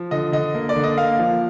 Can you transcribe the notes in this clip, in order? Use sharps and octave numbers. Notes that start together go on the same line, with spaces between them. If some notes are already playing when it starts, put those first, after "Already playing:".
Already playing: F3
D3 D#5
D3 D#5
A#3
D5
D3
D#5
A#3 F5
F3